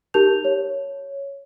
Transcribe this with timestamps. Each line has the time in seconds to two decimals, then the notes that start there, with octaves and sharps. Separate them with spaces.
0.14 D#4 G4 A#4 A5 G6 F7
0.45 C#5